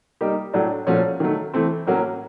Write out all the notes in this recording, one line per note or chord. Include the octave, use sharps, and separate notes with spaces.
G3 A#3 D#4 G4
A2 F#3 A3 D4
A#2 F3 A3 C#4 F#4
D#3 F#3 A3
E3 A3 C4
A2 F#3 A#3 C#4 F#4